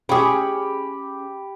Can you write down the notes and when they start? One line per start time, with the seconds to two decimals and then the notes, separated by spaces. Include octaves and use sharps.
0.09 C#4 G4 G#4 G5 B5